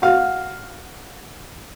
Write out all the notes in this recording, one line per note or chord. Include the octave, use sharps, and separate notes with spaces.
F#4 F5